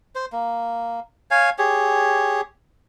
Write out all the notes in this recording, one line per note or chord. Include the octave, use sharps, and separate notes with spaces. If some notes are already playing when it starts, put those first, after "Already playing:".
C5
A#3
C#5 F5 G#5
G4 G#4 C#5